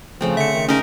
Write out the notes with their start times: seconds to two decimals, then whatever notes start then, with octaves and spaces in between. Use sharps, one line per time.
0.21 C#3 F3 A3 C4
0.37 D3 E5 C#7
0.53 D#3
0.69 C#3 C#4 D#4 A#4 E5